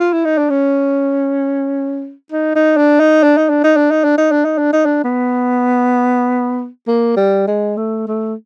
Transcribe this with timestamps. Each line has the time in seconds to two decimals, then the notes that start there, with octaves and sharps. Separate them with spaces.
0.00 F4
0.13 E4
0.25 D#4
0.38 D4
0.50 C#4
2.32 D#4
2.55 D#4
2.77 D4
3.00 D#4
3.23 D4
3.37 D#4
3.49 D4
3.64 D#4
3.77 D4
3.91 D#4
4.04 D4
4.18 D#4
4.31 D4
4.45 D#4
4.58 D4
4.73 D#4
4.86 D4
5.04 B3
6.87 A#3
7.17 G3
7.47 G#3
7.77 A3
8.08 A3